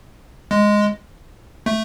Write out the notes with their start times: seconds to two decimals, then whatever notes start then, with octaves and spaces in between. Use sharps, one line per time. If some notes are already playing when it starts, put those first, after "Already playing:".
0.51 G#3
1.66 A3